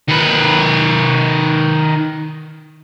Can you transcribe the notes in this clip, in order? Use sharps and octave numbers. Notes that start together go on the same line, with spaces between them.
D#3 B4